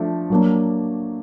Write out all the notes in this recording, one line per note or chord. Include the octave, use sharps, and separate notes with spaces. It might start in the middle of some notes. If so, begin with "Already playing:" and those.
Already playing: F3 A3 D4
F#3 A#3 D4